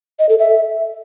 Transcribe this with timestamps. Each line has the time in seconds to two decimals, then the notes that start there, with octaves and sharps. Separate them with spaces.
0.19 D#5
0.29 A4
0.39 E5